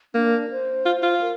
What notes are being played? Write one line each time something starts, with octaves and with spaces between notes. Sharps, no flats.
A#3 D4
C5
F4
F4
A#4